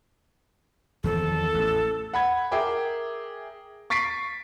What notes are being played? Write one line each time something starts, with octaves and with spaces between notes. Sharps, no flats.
E2 D#3 F3 A4
A1
F#5 B5 G#6
G#4 A#4 E5 G5 D6
C#6 A6 B6 C7 D7